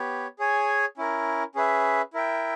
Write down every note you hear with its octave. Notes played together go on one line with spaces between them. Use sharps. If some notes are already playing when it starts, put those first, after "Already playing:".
Already playing: B3 G4 C#5
G#4 C#5 G#5
C#4 E4 A#4
C#4 G#4 B4 E5
E4 A#4 E5 G5